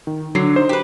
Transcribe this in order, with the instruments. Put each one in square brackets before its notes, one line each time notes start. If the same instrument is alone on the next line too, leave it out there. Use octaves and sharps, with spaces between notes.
[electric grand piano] D#3
[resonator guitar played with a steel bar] D3 [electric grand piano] F#3 C7
[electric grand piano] D#4 C5
[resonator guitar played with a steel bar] G4 B4